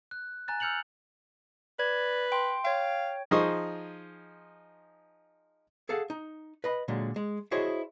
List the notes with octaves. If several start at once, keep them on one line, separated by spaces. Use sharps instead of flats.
F#6
G#5 A#5 F#6 A6
E6 F6 G6 C#7 F7 F#7
B4 D5 G#6
G5 C6
C#5 F5 G5
F3 D#4 G#4 C5 C#6 D#6
G#4 A4 F5 F#5
D#4
B4 D#5 B5
A#2 D3 F#3 G#3
G#3
E4 F#4 G#4 C5 C#5 D#5